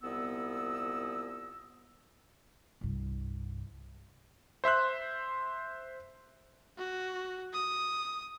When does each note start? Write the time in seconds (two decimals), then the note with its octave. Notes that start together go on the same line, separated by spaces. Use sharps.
0.03 C2 A#2 B3 D#5 E6
2.81 C2 G2
4.64 C5 E5 C6 F#6
6.78 F#4
7.53 D#6